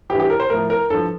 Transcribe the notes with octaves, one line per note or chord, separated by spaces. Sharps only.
G2 E3 G4
G4
A#4
C5
A2 F3 A#4
A#4
G2 F3 A4